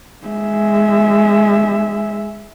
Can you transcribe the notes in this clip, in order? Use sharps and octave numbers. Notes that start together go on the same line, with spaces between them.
G#3 E5